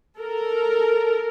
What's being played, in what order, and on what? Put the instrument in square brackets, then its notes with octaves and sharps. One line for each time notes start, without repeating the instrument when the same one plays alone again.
[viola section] A4 A#4